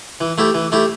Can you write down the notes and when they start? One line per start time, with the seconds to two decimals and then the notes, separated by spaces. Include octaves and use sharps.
0.21 E3
0.38 A3 E4 G4
0.55 E3
0.72 A3 E4 G4